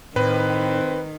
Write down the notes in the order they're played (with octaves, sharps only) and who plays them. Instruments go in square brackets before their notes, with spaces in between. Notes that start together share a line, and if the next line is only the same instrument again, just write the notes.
[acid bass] A2 [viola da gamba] D#3 [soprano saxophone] C4 [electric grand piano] B4